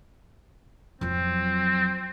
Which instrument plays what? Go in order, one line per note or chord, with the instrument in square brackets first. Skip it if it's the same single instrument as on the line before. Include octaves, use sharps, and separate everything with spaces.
[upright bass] F2 F#3 [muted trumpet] C4